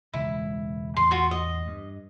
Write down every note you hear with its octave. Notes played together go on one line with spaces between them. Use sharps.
E1 C#2 G#3 E4
A1 E2 C6
F4 F#4
D#5
G2